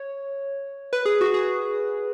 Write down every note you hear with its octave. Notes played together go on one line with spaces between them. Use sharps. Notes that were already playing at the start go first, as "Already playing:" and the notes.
Already playing: C#5
B4
G#4
F#4
G#4